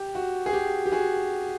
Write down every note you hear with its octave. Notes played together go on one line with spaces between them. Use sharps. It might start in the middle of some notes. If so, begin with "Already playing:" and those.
Already playing: G4
F#4
G#4
G4
G4
F#4 G#4